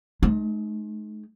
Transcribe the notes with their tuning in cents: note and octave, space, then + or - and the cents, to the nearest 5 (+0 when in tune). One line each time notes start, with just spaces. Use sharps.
G#3 +45 D#4 -15